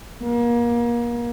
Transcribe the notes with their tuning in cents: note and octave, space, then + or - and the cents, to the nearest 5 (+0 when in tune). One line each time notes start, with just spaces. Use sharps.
A#3 +30